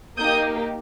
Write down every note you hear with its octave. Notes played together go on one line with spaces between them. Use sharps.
A#3 D#4 G4 D#6 G6